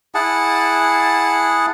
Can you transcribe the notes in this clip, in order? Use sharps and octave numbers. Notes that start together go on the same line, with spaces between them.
E4 G#4 F#5 A5